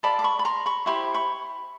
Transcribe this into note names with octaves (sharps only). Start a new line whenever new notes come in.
F4 A4 D5 A5 B5
D6
B5 C#6
B5
A#5 C6
B5 C#6
E4 G4 C5 B5 C#6
B5 C#6